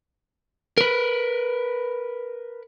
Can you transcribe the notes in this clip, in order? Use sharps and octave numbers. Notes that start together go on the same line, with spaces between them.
A#4 B4